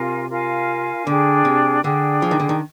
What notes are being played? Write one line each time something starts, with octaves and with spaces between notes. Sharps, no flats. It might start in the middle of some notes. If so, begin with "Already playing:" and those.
Already playing: C3 F4 A#4 F5 G#5
F4 A#4 F5 G#5
D3 D4 G#4 D5 G5
C3
D3 D4 G#4 D5 G5
F3
D#3
D3
D#3